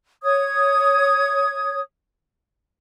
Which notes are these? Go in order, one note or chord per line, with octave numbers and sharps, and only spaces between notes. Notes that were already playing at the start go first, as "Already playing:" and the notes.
C#5 D#6 G#6